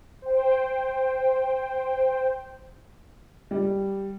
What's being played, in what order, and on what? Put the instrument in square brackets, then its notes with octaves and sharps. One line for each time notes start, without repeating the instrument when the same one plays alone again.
[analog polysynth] C5 G5
[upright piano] G3